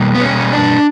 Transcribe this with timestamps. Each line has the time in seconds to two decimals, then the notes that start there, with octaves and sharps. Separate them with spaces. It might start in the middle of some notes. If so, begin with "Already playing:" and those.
Already playing: B2 G3 A#3
0.14 B3
0.22 C#4
0.53 D4